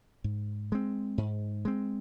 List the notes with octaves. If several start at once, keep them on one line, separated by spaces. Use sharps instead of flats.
G#2
G#3 C4
G#2
G#3 C4